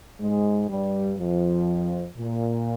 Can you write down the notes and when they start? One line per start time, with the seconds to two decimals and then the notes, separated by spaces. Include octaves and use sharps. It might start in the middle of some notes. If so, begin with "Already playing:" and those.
0.21 G#2 G#3
0.70 G2 G3
1.19 F2 F3
2.17 A#2